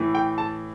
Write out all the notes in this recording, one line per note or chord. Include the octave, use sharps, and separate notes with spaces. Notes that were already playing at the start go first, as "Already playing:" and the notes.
Already playing: A2 E3
G5
A5